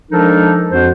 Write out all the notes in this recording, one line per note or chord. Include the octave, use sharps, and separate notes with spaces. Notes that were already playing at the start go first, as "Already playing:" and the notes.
F3 G#3 D4 D#4 A4 A#4
F2 F3 F#4 C5